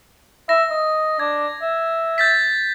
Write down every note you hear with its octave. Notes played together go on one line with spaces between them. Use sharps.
E5 A#6
D#5
D4 G#6
E5
G6 A6 B6